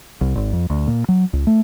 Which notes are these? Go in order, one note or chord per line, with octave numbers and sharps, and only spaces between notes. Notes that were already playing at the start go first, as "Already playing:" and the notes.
C2
G#1
F2
D2
A#2
F#3
C#2
A3